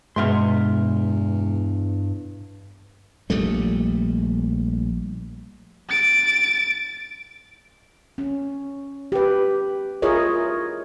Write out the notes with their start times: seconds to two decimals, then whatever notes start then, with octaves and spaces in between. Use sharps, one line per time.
0.16 E2 G2 B2 G#3 B3 E5 C6 F6
3.30 A#1 G3 A3
5.89 A6 D7
8.18 C#4
9.12 G4 B4
10.02 E4 F4 G#4 A#4 C#5 D#5